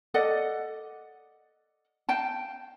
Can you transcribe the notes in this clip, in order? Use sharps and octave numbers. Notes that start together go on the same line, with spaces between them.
A4 D5 D#5 F#5
F5 G5 A5